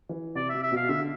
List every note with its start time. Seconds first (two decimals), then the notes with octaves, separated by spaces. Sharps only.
0.09 E3
0.35 C3 D5
0.49 E5
0.54 C3
0.63 E5
0.72 B2 F5
0.89 D3 E5